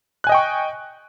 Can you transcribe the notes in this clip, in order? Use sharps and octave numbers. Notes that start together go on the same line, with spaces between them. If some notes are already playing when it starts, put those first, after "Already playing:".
D#5 G5 G#5 C#6 F#6